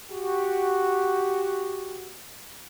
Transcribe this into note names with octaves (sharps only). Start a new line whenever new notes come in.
F#4 G4